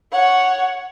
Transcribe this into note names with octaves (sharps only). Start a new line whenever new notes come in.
C#5 F#5